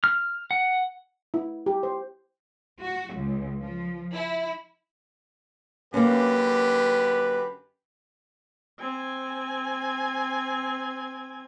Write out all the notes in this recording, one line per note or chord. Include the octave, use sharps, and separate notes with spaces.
F6
F#5
E4
G4
C5
F#4
C#2
F3
E4
F#2 D3 A#3 C#4 G4 B4
C4 G#5